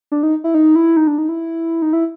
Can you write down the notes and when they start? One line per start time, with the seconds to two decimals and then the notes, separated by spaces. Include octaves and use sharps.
0.12 D4
0.23 D#4
0.44 E4
0.54 D#4
0.76 E4
0.97 D#4
1.07 D4
1.18 D#4
1.29 E4
1.82 D#4
1.93 E4